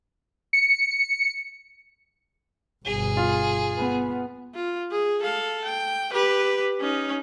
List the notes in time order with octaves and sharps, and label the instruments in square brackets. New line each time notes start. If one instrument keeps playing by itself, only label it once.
[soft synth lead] C#7
[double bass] G1 B2 [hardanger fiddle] G#4
[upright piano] F4
[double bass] B3
[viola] F4
G#4
A4 F5
G5
G4 B4
C#4 D#4